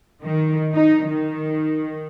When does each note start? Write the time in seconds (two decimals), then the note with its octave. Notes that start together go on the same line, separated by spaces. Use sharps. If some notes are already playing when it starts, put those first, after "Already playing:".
0.22 D#3
0.72 D#4
1.05 D#3